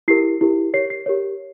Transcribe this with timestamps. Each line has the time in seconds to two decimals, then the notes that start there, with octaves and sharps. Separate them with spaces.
0.08 E4 G4 A#4 C7
0.41 E4 G4 A#4
0.74 G4 A#4 C#5 C7
0.90 C7
1.06 G4 A#4 C#5